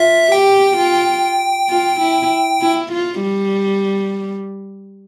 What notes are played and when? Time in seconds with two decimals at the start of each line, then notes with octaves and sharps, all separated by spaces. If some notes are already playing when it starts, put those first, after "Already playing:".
Already playing: F4 E5
0.31 G4 G5
0.77 F4
1.69 F4
2.00 E4
2.61 E4
2.92 F4
3.22 G3